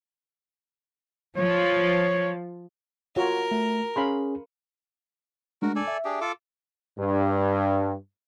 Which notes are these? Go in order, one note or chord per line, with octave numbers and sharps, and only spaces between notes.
F3 C#5
F4 F#4 A#4 C#5
A3
C#4 G#4 F5 B5 C6
G#3 A3 D4 F#4 A#4
A4 D5 G#5
E5
D4 G4 G#4
F4 A4 D6
G2